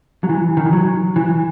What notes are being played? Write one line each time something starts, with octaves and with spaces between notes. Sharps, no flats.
F#3
E3
D#3
E3
F#3
E3